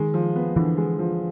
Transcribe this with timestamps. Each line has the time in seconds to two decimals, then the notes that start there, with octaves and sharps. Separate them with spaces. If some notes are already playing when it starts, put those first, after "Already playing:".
Already playing: D#3 G#3
0.14 F3
0.35 B3
0.56 D3 E3
0.77 G#3
0.99 F3